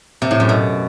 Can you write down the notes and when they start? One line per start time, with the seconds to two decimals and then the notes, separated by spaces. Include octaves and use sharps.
0.22 C3
0.31 A2
0.40 F#2
0.49 B2